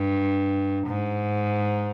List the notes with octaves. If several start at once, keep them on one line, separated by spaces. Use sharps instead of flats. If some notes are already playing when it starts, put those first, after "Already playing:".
Already playing: G2
G#2